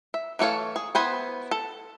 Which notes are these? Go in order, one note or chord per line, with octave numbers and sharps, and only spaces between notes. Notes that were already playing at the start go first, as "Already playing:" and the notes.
E5
E3 A3 A4 C#5 F5
G#4
B3 E4 C5 G#5 B5
A4